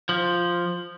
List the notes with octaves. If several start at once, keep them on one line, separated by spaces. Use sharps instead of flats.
F3